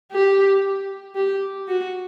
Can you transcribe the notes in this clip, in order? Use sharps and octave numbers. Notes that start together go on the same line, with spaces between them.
G4
G4
F#4